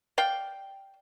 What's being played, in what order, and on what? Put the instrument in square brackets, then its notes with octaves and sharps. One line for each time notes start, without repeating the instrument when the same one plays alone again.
[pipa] D5 F5 G5